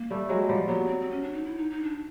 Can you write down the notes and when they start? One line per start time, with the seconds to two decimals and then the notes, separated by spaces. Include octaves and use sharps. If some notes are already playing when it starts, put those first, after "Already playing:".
Already playing: A#3
0.10 G3 A3
0.29 F#3 G#3
0.49 F3 G3
0.68 F#3 B3
0.87 C4
1.00 C4
1.11 C#4
1.23 D4
1.33 D#4
1.45 E4
1.57 D#4
1.71 D#4
1.83 D4